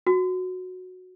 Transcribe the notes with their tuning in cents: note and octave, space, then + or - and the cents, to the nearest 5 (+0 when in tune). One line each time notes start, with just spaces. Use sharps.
F#4 -10